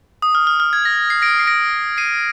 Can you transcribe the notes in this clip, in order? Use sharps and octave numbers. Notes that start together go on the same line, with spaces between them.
D#6
F6
F6
F6
G#6
A#6
C7
A#6 D7
C7
A#6 D7
C7 D#7